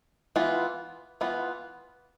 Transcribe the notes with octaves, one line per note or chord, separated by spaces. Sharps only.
E3 B3 F4
E3 B3 F4